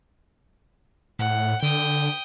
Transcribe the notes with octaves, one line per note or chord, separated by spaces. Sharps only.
A2 F#5
D3 G5 D#6